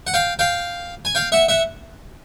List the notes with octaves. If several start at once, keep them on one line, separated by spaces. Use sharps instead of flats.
F#5
F5 G5
F5 G5
G#5
F5 G5
E5 F#5
E5 F#5